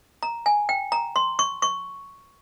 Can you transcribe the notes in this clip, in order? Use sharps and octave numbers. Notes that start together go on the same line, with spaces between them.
A#5
G#5
G5
A#5
C6
C#6
C#6